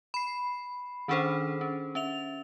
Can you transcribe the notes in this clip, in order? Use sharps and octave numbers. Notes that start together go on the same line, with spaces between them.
B5 C7
D#3 C#4 D4 G#4 A4 C5
C#4
C#4 E5 F7